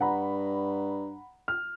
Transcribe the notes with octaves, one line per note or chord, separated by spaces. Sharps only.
G2 F#5 A#5 B5
F6